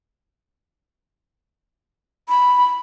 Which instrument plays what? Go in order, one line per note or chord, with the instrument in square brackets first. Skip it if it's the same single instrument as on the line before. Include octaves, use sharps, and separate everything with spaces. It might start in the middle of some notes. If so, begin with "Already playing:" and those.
[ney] B5